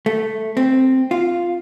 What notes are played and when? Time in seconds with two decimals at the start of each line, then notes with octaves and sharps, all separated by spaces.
0.06 A3
0.57 C4
1.11 F4